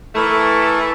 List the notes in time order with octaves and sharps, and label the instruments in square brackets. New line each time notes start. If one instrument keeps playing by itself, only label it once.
[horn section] E3 A3 [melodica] E4 A#4 C#6